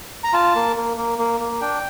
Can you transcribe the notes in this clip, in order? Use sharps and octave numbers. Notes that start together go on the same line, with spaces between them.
A#5
F4 A5
A#3
A#3
A#3
A#3
A#3
D4 G5